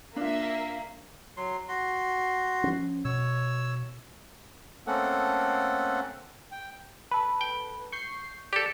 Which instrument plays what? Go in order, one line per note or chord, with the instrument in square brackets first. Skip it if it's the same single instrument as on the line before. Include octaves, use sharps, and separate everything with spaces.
[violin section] A#3 [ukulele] D4 F4 [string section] E5
[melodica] F#3 C6
F#4 C6
[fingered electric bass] F3 C#4
[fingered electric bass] B2 [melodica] C#5 E6
[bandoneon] A3 A#3 C4 C#4 A4 F#5
G5
[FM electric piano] A4 B4
[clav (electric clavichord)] G5
[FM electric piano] C#6 G6 C7
[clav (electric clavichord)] G4 A4 [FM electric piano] D5